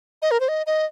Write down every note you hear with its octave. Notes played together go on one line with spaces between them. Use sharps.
D#5
A#4
C5
D#5
D#5